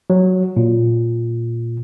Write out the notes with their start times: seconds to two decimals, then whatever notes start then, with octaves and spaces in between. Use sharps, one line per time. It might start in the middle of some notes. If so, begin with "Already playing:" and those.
0.10 F#3
0.56 A#2